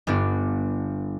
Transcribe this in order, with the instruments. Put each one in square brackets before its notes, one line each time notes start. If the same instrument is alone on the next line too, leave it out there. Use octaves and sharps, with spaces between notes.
[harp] G1 G2 B3 D4